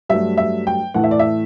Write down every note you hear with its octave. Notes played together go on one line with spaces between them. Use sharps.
G2 F#3 A3 E5
E5
G5
A2 E3 A3 F#5
E5
D5
E5